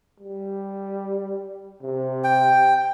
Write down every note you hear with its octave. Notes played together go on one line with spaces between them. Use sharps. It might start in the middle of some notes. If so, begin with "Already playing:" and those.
G3
C3
G5